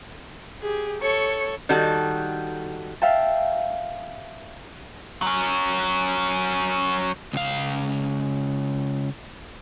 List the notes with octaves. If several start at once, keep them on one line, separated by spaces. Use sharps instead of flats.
G4 G#4
A4 C#5 C#6
D#3 G3 F#4 A4
E5 F5 G5 A5
F#3 C#4
C#2 F5